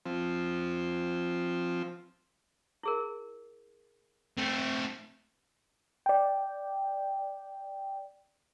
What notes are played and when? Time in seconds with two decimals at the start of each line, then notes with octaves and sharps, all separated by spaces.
0.06 F3 C4
2.83 E4 G#4 A#4
4.38 A3 C4
6.06 D5 G5